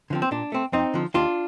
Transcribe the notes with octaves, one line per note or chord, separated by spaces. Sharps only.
D3 F3 C4
C4
A#2 D4
A3 C4
F2 C4 D#4
D3 F3
D#2 D4 F4